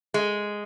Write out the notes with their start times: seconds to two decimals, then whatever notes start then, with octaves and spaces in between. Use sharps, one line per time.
0.14 G#3